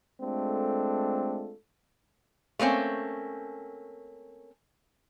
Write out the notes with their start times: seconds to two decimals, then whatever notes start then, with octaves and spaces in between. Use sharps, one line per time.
0.20 G#3 A3 C4 D4 F4 A4
2.59 A3 A#3 C4 C#4